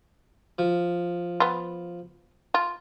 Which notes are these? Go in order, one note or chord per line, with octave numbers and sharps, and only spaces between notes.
F3
B3 F4
F4